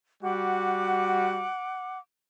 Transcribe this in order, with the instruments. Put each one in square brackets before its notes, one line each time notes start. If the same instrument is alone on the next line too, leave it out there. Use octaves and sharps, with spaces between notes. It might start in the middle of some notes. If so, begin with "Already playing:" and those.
[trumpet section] G3 F#4 [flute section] F#5 D6